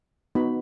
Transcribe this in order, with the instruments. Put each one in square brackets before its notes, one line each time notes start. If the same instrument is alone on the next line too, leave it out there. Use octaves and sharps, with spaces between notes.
[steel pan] B3 D#4 F#4 B5